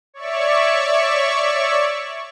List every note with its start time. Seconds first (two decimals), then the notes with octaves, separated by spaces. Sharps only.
0.14 C#5 D5 E5 C#6